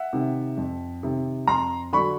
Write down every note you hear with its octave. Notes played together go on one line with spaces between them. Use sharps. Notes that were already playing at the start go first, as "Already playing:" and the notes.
Already playing: E5 F#5
C3 D#3
F2
C3 D#3
F2 A#5 C6
D3 F#3 B5 C#6